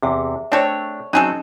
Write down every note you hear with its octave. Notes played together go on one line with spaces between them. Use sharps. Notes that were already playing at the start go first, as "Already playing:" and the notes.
E2 C3 G#4 E5
A3 C4 D4 A4 C#5 D5
F#3 C4 C#4 D#4 G#4 A4